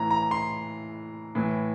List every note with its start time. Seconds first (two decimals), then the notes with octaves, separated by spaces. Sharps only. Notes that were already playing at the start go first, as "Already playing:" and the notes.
Already playing: A2 E3 A#5
0.11 A#5
0.31 C6
1.35 A2 E3